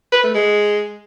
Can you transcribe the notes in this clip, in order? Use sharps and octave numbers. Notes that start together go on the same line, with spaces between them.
B4
A3
G#3